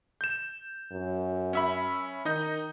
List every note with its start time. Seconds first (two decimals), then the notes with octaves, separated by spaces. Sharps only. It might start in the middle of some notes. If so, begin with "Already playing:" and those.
0.21 G6 E7
0.92 F#2
1.53 C#4 E5 B5
2.25 D#3 D#4 D#5 G6